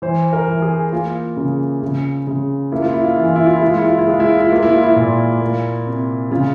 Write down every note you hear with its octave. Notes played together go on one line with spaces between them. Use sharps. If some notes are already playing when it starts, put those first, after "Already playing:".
E3 C5
A#4
E3
G#4
A#3 F4
C#3
C#3
C#3
A#3 E4
F4
E4
F4
E3 E4
F4
E4
F4
G#3 E4
F4
E4
F4
E4
G#3 F4
E4
F4
E4
A#3 F4
E4
F4
E4
A#2
A#3
C3
C#3 F4